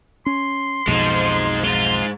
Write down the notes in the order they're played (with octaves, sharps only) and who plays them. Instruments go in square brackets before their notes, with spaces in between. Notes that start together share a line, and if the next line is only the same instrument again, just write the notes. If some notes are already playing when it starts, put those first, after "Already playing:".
[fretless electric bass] C#4 [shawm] C6
[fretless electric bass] B1 F2 B2 [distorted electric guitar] F3 [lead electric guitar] G#3 D#4
[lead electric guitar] G#2 G#3 [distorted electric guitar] F4